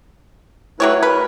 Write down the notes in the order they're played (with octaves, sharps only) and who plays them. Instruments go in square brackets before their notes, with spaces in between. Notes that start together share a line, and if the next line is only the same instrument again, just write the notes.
[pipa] F#3 G4 C#5 [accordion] A3 E4 B4
[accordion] A#4 [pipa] B4